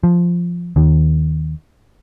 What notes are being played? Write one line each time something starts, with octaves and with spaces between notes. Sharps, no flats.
F3
D#2 D#3